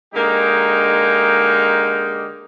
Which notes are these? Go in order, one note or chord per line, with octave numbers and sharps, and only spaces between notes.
D3 G#3 A#3 D#4 G4